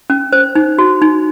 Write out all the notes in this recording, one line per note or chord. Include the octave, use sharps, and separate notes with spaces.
C#4
C5
D#4
F#4
D#4